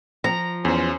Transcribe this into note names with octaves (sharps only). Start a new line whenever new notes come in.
F3 A#5
E2 C#4 C5